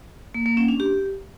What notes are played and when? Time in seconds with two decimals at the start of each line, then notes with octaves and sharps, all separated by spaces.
0.34 A#3
0.46 A#3
0.57 C#4
0.68 D4
0.80 G4